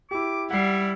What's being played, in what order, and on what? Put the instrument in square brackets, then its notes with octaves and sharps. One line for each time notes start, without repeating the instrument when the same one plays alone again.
[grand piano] E4 G4 [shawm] D6
[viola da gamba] G3 [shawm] E4 [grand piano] F#5 C7